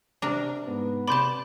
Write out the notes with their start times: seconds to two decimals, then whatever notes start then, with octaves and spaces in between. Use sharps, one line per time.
0.22 C3 D4 A#4
0.66 G#2 B3
1.08 C3 D5 A5 B5 C6 G6